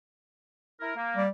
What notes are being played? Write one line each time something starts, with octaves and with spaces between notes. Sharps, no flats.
E4 A#4
A#3
G3